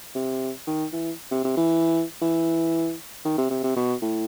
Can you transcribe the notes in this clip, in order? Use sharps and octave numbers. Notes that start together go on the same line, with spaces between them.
C3
D#3
E3
C3
C3
E3
E3
D#3
C3
C3
C3
B2
A2